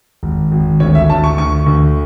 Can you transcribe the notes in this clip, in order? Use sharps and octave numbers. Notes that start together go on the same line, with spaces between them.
G#1
G#1
D2 C#5
E5
D2 A5
C#6
D2 C#6
D2